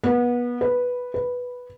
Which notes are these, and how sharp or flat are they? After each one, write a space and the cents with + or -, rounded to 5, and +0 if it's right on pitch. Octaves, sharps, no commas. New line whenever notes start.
B3 -25
B4 -5
B4 -5